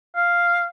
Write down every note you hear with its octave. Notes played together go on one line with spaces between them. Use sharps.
F5